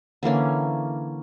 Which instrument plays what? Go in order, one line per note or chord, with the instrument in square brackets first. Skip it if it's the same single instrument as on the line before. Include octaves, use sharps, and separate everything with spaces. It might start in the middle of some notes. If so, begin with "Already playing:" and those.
[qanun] D3 E3 A#3 C#4